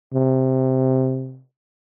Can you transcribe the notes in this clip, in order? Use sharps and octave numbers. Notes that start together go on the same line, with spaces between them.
C3